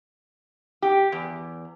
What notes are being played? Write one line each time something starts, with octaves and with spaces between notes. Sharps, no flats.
G4
E2